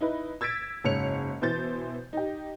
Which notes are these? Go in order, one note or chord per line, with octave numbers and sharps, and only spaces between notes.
D#4 E4 B4
E6 G#6 A6 B6 D7
F#1 G#2 C#5 C#7 F7
B2 E3 C5 G6 A6
D#4 G4